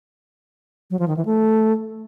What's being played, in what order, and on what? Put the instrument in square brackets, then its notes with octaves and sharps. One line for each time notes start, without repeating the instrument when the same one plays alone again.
[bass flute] F#3
F3
D#3
E3
A3